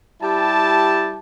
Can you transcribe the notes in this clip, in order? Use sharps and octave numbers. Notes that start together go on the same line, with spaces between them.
G3 E4 G4 A5